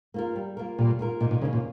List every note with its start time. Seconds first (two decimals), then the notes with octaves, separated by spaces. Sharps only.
0.14 A#3 F4 A#4
0.36 G3
0.57 A#3 F4 A#4
0.78 A#2 G3
0.99 A#3 F4 A#4
1.20 A#2 D#3
1.31 A#2
1.42 C#3 A#3 C#4
1.53 A#2